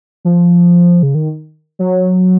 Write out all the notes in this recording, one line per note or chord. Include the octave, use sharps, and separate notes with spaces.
F3
C#3
D#3
F#3